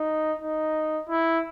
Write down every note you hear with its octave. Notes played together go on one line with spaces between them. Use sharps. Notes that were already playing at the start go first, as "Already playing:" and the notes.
Already playing: D#4
D#4
E4